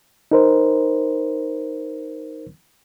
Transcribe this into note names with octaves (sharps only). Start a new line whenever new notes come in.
D#4 A#4 C5